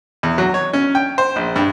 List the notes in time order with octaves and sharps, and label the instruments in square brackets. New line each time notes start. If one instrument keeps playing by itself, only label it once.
[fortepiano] E2
F#3
C#5
C#4
G5
C5
A#1
G2